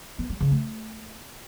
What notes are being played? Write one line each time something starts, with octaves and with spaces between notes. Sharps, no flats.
B3
G3
C#3
A3